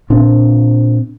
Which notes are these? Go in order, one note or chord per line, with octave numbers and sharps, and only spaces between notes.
A#2 C4 D4